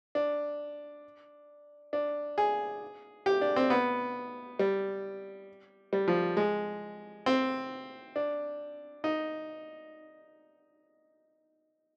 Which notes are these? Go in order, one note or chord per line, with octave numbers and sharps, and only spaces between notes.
D4
D4
G#4
G4
D4
C4
B3
G3
G3
F3
G#3
C4
D4
D#4